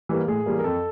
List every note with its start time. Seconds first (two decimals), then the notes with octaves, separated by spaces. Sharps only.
0.09 E3 G3 A#3
0.27 A2 G#4
0.46 E3 G3 A#3
0.59 A#4
0.64 F2 A4